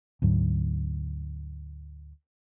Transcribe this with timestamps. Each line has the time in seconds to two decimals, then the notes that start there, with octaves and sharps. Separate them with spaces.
0.22 D2 G#2 F#3